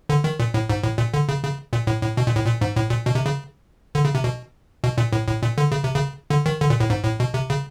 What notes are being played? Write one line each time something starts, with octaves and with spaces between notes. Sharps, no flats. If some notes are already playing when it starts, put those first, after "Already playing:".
D3
D#3
A#2
A2
G#2
A2
A#2
D3
C#3
C#3
A#2
A2
A2
B2
A#2
A2
A#2
G#2
A2
A#2
B2
C3
C#3
D3
C#3
C3
B2
B2
A#2
A2
A2
A#2
D3
C#3
C3
C#3
D3
D#3
D3
A#2
A2
G#2
A2
B2
C3
C#3